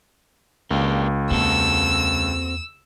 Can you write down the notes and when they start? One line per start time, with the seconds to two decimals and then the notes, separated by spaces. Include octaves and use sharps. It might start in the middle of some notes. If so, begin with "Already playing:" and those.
0.71 C#2 A#3 D4 G4
1.30 E2 A#3 C4 F#4 A4 E6